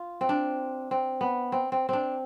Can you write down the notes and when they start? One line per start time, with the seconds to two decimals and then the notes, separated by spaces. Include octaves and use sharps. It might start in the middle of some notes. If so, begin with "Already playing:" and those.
Already playing: F4
0.21 C4
0.29 D4
0.91 C4
1.21 B3
1.52 C4
1.72 C4
1.89 C4 D4